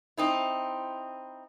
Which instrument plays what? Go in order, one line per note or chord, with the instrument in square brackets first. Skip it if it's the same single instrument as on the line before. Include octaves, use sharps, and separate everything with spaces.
[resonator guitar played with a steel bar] C4 D#4 E4